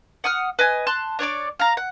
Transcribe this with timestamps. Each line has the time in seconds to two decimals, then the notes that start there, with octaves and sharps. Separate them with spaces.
0.24 F#5 D#6 F6
0.59 B4 D#5 G#5
0.87 A5 C6 F#6
1.19 D4 C#5 D5 D6
1.59 F5 A#5
1.77 F#5